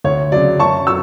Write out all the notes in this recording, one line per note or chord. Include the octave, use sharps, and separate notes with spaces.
D2 C#5
C#3 F#3 D5
F#2 A5 C#6
F#3 C#6 E6